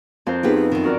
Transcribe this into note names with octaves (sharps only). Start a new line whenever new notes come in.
F2 A#4 C5
B3 D#4 F4 G4 G#4 B4
F4
F#2 D#3
F#4 A#4 D5